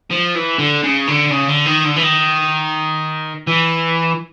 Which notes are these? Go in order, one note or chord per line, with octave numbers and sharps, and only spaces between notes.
F3
E3
D3
C#3
D3
C#3
D3
D#3
D3
E3
D#3
E3